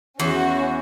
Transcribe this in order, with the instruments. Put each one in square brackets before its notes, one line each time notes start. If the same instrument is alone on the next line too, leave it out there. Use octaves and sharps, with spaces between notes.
[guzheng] E2 [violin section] C#4 F#4